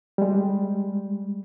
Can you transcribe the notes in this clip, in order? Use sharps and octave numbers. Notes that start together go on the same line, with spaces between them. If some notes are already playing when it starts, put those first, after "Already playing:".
G3 G#3